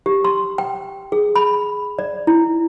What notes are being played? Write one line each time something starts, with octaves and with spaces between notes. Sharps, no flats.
G4
C6
G5
G#4
B5
D5
E4